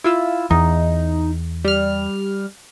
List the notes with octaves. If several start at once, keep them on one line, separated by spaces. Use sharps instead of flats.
E4 F4 E6
E2 D#4
G3 F6